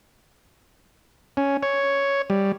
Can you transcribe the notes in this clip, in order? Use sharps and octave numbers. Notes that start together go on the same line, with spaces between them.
C#4
C#5
G3